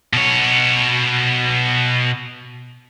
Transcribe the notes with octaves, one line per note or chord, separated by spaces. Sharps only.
B2 C#5